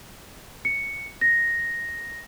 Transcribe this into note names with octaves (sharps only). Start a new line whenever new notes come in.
C#7
A#6